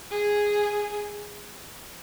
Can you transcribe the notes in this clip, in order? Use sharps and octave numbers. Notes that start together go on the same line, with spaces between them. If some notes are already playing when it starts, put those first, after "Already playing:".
G#4